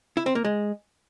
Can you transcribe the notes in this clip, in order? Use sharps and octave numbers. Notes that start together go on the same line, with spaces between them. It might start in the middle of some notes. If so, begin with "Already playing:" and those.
E4
C4
A#3
G#3